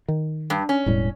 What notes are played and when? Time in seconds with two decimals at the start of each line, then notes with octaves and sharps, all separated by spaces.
0.08 D#3
0.50 G2
0.69 C#4
0.86 E1 A2 G3